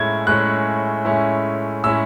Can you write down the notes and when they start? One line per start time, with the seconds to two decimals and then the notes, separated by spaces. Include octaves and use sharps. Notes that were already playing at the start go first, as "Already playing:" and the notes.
Already playing: A2 G#3 C#4 E4 G#6
0.27 A2 G#3 C#4 E4 F#6
1.05 A2 G#3 C#4 E4
1.84 A2 G#3 C#4 E4 E6